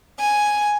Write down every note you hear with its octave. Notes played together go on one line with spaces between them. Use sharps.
G#5